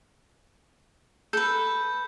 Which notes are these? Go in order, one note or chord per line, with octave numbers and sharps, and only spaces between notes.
A4 B4 G6